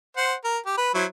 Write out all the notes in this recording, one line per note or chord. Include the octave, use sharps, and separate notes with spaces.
C5 F#5
A#4
G4
B4
F#3 E4 C5